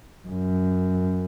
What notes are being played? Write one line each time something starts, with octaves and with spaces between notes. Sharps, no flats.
F#2